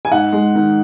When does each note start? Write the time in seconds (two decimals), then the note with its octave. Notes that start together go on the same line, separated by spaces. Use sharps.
0.05 G#5
0.11 G#2 F#5
0.32 G#3
0.55 D#3